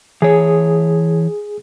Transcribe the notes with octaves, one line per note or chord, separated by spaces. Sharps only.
E3 G#4 C#5